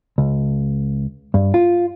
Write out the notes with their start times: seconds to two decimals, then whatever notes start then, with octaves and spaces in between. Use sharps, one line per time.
0.18 C#2
1.34 G2
1.54 F4